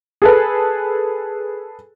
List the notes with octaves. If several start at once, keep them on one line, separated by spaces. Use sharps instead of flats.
G#4 A4 B4